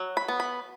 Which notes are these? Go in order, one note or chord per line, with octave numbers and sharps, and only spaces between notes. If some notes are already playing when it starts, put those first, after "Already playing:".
Already playing: F#3
B5
B3
B5